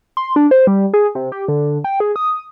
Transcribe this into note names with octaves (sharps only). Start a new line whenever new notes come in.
C6
D4
C5
G3
G#4
C3
G4
D3
G5
G#4
D#6